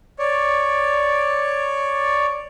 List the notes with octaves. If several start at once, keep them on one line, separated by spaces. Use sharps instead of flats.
C#5 D5